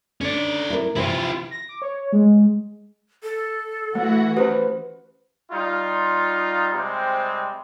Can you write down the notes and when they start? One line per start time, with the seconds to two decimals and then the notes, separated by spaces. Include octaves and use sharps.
0.21 D3 C#4 D5
0.70 E4 A#4
0.96 C3 E3 F3 E4 F4
1.51 A#6
1.69 D6
1.82 C#5
2.13 G#3
3.23 A4
3.95 E3 A3 F#4
4.37 C#4 G4 B4 C5
5.51 G3 D#4 F4
6.73 C3 G3 G#3 C4